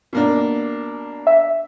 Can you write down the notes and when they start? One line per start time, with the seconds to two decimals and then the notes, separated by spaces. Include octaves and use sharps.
0.13 B2 A#3 D4
1.27 E5